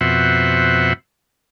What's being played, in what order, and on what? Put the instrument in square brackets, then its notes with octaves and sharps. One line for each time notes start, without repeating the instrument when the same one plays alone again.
[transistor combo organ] F2 B2 C5 E5 F#5